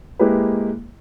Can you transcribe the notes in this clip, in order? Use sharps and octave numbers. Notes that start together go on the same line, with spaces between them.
G#3 A#3 E4 G4 B4